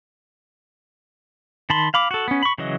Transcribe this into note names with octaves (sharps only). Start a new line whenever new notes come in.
D#3 A5 B5 C6
F5 B5 D6
F#4 A4
B3 C#4
B5 C#6
C#3 E3 F#3 D#5